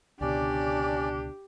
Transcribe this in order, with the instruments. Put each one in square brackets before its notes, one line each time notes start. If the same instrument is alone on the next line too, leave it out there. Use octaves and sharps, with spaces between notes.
[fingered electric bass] C#2 B2 D3 [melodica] C#4 D5 [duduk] D4 [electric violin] G4